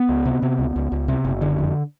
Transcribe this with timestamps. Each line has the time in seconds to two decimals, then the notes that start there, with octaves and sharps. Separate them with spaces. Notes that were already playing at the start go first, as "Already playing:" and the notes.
Already playing: B3
0.09 C#2
0.25 C3
0.42 C3
0.59 C#2
0.76 C#2
0.92 C#2
1.08 C3
1.25 F#1
1.42 D3
1.58 F2